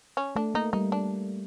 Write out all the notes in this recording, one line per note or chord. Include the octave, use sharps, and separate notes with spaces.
C#4
A3 D4
A#3 D#4
G3 D#4
D4